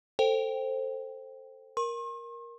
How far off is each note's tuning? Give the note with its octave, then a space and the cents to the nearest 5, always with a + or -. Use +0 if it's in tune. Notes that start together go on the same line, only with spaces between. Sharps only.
A4 +15 C5 +10 G5 +0
A#4 +10 C6 +45